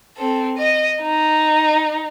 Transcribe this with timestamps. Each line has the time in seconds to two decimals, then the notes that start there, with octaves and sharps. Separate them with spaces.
0.17 C4 A4
0.58 D#5
1.02 D#4